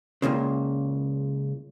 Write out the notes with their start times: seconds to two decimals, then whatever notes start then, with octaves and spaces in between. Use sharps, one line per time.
0.22 C#2 F#2 A#2 C#3